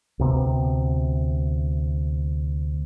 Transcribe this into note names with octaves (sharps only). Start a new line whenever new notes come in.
D2 C3 B3